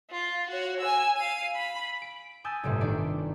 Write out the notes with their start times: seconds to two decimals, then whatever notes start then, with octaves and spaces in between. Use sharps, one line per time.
0.11 F4
0.50 F#4 C#5
0.81 G#5 E6
1.16 F5 D#7
1.55 B5
2.02 D7
2.44 G#5 A5 D#6 E6 G6
2.63 G1 A2 C3 G3
2.81 D#3 A3 D4 D5